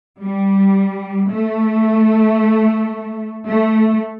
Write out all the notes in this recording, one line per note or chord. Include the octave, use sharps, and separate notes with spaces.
G3
A3
A3